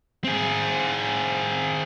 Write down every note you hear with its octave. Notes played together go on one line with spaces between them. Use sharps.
C4 G#4